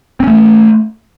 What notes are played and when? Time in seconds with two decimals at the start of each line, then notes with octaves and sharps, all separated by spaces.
0.20 C4
0.24 C#4
0.27 A3